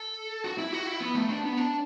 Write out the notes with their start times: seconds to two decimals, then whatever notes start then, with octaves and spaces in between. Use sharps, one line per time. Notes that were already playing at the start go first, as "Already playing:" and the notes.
Already playing: A4
0.44 F#4
0.58 E4
0.72 F#4
0.87 E4
1.01 B3
1.15 A3
1.29 D4
1.43 B3
1.57 D4